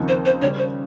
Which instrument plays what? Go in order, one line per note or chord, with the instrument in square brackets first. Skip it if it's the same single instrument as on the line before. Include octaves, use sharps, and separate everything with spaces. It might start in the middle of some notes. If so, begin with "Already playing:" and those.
Already playing: [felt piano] D#2 C#3 F3 C4 D#4
[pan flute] C5
C5
[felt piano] C#3 G3 C#4 [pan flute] C#5
[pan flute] C5